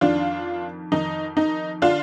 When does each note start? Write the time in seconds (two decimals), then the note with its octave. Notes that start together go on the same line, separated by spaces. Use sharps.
0.01 F2 D#3 D4 F4
0.92 F2 D#3 D#4
1.37 D#4
1.82 D3 D4 F4